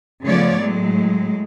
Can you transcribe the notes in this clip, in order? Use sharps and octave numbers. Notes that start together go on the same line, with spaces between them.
C#3 F3 A3 B3 C#5 D5
A2 F#3 G#3